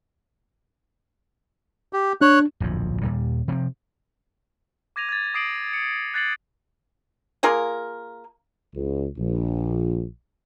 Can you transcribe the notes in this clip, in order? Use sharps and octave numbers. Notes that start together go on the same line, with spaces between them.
G4
D4 C#5 F#6
D1 A#1 F2 F3
D#2 A#2 G3
C3 F3 C4
D6 G#6 A#6 D#7 F7
G#6 A6
D6 D#6 C7 D7 D#7 F#7
C#7
F#6 G#6 A6 C7 C#7 F#7
A#3 F4 G#4 A#4
C#2
A#1